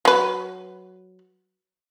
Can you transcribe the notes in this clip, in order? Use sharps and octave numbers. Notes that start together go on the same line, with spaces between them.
F#3 B4